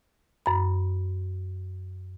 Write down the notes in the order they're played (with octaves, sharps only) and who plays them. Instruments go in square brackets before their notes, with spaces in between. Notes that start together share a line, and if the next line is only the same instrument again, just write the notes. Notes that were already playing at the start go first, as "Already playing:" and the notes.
[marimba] F#2 B5